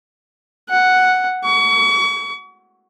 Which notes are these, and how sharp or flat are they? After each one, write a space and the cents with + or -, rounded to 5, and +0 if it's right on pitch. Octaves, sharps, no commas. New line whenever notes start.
F#5 +0
C#6 +35